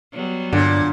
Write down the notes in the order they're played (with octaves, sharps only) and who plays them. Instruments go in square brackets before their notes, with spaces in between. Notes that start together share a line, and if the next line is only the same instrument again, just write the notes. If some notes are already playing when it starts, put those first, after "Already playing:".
[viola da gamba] F#3 G3 B3
[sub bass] G2 [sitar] A#2 [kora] D3